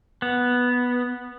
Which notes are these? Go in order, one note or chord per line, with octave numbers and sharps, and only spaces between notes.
B3